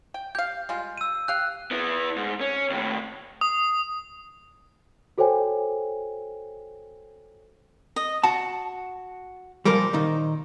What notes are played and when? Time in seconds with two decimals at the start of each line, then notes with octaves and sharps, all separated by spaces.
0.14 G5
0.35 G4 F5 G6
0.69 G3 G#3 F4
0.98 E6 D#7
1.28 G4 F5 G5 F#6
1.71 B3 E4
2.16 G#2
2.41 C#4
2.70 D#2 A2
3.41 D#6
5.18 F#4 A4 C5 C#5 G5 G#5
7.96 D#5
8.23 F#4 A5
9.65 A#2 F3 G3 A#4 C5 D6
9.93 A#2 D#3 D#4